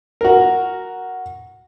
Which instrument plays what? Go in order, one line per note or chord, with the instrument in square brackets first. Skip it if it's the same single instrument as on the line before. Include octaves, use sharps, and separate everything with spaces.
[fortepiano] F#4 A#4